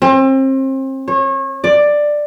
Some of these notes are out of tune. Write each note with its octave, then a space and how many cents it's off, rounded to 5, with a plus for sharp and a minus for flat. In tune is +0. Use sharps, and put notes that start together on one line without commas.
C4 +35
C#5 -30
D5 +10